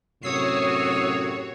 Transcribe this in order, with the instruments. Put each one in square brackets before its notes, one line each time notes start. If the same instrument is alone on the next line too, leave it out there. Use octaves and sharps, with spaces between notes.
[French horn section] F#2 A2 C3 [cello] F#4 [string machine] C#5 [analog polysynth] D#6 E6 C7